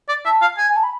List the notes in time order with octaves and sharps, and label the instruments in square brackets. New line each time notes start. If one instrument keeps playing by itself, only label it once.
[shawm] D5
[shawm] E5 [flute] A5
[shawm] F5
G#5
[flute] G#5
A5
B5